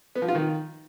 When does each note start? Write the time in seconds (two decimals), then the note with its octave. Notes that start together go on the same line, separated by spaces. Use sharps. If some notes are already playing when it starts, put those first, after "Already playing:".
0.16 B3
0.22 F3
0.28 F4
0.35 D#3